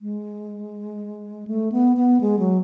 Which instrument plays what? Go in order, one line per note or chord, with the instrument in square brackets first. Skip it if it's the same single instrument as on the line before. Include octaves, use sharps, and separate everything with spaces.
[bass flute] G#3
A3
B3
B3
G#3
F#3